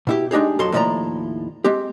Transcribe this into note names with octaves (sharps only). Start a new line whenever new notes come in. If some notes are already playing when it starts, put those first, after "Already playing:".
B2 E4 G4
G#3 D4 D#4 G4 G#4
F2 F3 F#3 A4 C6
D#2 A2 F3 E4 D5 A#5
G#3 C4 G4